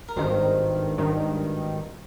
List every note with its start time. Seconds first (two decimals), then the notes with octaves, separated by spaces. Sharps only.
0.08 A#4
0.16 G#1 G2 D#3 C5
0.98 G#1 G2 D#3